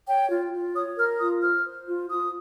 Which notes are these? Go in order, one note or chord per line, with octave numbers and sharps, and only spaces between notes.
C#5 G5
F4
F4
C#5 D#6
A#4 F6
F4 D#6
C5 F6
C5
F4
F4 D#6